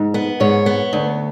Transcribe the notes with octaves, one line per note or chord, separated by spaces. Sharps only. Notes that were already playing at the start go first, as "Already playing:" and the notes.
Already playing: G#2
B3
G#2 C#5
B3
D2